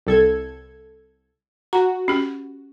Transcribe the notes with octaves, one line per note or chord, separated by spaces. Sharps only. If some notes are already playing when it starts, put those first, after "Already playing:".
C2 A4 G#6
F#4 A#5
C#4 G4